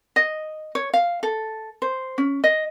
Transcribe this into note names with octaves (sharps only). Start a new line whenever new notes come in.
D#5
C#5
F5
A4
C5
C#4
D#5